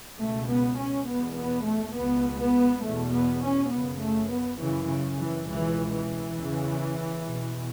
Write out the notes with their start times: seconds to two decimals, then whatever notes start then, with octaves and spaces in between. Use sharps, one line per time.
0.19 C#2 B2 A3
0.49 B3
0.78 C#4
1.08 E2 B2 B3
1.37 B3
1.66 A3
1.95 C#2 B2 B3
2.39 B3
2.84 E2 B2 A3
3.13 B3
3.43 C#4
3.71 F#2 C#3 B3
4.00 A3
4.31 B3
4.60 F#2 C#3 E3
4.89 C#3
5.19 E3
5.48 C#2 B2 E3
5.92 E3
6.35 E2 C#3
7.25 E2 B2